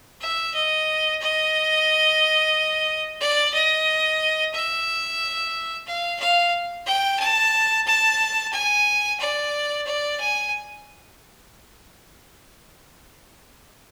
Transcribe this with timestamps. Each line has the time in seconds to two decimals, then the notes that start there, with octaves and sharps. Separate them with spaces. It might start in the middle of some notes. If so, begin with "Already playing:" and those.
0.21 E5
0.54 D#5
1.21 D#5
3.20 D5
3.54 D#5
4.54 E5
5.87 F5
6.20 F5
6.86 G5
7.19 A5
7.87 A5
8.52 G#5
9.20 D5
9.86 D5
10.20 G#5